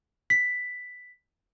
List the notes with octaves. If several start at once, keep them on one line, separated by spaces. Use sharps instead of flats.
B6